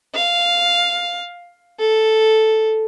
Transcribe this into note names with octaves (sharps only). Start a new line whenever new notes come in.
F5
A4